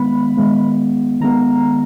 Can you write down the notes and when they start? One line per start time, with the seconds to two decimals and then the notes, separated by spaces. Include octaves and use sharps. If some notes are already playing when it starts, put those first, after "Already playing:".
Already playing: D#3 G#3 B3 B5
0.37 D#3 G#3 B3
1.20 D#3 G#3 B3 A#5